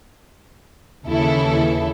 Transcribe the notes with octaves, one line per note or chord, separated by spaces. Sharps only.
D#2 C#3 E3 E4 A4